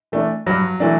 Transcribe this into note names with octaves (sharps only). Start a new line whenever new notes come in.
E3 A3 D4
G2 F#3
E3 A3 D4